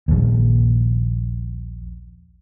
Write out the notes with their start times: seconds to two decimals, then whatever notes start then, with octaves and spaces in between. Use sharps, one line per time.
0.08 A#1 D#2